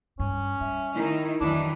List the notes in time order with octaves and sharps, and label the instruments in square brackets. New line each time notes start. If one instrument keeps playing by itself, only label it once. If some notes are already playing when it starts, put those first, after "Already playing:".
[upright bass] G2 [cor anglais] C#4
[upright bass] G3 [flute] E5
[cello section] D#3 [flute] E4
[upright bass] F2 [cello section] D#3 E3 F#3 [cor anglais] D4